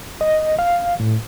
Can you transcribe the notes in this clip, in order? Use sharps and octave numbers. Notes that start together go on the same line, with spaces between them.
D#5
F5
A2